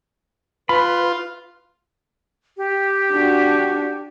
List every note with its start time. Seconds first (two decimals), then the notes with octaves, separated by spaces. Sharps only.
0.69 F4 B4 B5
2.57 G4
3.12 D4 F#4